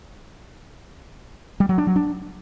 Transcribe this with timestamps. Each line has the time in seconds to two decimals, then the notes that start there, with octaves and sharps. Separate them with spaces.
1.60 G3
1.69 F#3
1.78 D4
1.87 F#3
1.96 D4